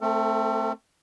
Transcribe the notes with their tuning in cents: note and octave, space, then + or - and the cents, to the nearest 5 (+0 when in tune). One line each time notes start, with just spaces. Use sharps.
A3 +0 C4 +0 A4 +40